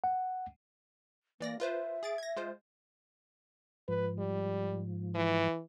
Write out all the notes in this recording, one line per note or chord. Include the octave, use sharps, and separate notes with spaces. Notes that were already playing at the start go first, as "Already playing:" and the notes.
F#5
E3 A#3 D5 A#6
F4 B4 C5 E5
G#4 A6 D7
G#6 A#6
G#3 F4 C5
G#2 F3 B4
G3
E3